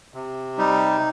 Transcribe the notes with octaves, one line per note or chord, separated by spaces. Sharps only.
C3
G3 D#4